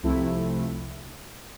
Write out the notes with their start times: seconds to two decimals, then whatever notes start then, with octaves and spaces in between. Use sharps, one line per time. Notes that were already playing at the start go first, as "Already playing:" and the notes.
0.03 C2 C3 F3 A3 E4